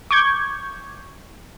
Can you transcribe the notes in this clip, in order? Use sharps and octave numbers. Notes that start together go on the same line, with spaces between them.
C#6 D6 G6 G#6